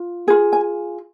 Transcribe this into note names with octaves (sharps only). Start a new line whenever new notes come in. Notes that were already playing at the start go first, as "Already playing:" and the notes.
Already playing: F4
F4 G#4
G#5